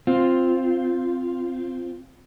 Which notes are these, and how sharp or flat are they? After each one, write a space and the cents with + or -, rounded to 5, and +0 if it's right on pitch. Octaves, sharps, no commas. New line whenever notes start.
C4 +0 F4 +0